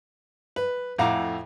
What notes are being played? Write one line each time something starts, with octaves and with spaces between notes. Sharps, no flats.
B4
F2 A2 F5 F#5 A#5 D6